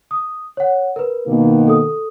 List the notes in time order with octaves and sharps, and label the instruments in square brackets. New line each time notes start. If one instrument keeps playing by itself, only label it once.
[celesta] D#6
C#5 F#5
A#4 B4
[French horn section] B2 D#3 A#3
[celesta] A4 D#6